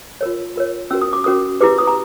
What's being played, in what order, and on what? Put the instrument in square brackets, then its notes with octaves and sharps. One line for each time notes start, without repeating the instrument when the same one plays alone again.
[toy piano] F4 A#4 C#5
F4 A#4 C#5
C#4 F#4 A#4 E6
D#6
D6
C#4 F#4 A#4 D#6
E4 G4 B4 D6
D#6
A#5